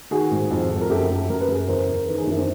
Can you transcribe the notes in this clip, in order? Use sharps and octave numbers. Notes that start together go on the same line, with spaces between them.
D#3 F#4 G#4
G#2
F2
F2
A#4
F#2 G4 A4
F#2
F#2 A#4
B4
F#2 G#4 A#4
E2 A#4 C5
E2
D#3 A4 B4
G#4 A#4
D#4
F#2 D4 E4
C4 D4